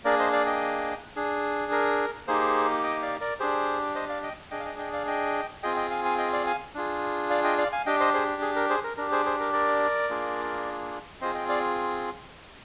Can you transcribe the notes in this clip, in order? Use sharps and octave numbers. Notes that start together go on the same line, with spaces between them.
A#3 D4 G#4 A#4 D5
C5 D#5
D5 F5
D#5 G5
D4 G#4
A#4
A#3 D#4 G4 G#4 C5
D#5 G5
D5 F5
A#4 D5
D4 G4 G#4 C5
C5 D#5
D5 F5
D#5 G5
D4 G#4 D#5 G5
F5
D#5 G5
D#5 G5
D5 F5
D#5 G5
C4 F4 G#4 D#5 G5
D#5 G5
F5 G#5
F5 G#5
D#5 G5
D5 F5
F5 G#5
D4 F4 G#4
D5 F5
D#5 G5
D5 F5
F5 G#5
D4 G4 D#5 G5
C5 D#5
G#4 C5
G#4
A#4
G#4 C5
A#4
D4 G4 A#4
G#4 C5
G#4 C5
A#4
A#4 D5
A#3 D4 F4 G#4
C4 F4 G#4 C5 D#5
D#5 G5
D5 F5